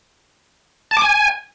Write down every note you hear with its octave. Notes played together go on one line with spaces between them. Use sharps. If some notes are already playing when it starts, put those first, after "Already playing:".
A5
D6
G#5